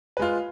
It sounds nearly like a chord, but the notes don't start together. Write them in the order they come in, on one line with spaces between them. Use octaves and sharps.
B4 G#3 F4